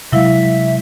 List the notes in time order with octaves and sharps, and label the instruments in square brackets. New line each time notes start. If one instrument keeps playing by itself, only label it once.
[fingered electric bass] C3 G#3 [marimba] F#3 E4 F5 [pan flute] E5